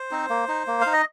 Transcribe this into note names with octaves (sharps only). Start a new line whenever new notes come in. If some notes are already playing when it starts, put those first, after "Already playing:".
Already playing: C5
C4 D#4
A#3
D#4
A#3
F5
D#4
D#5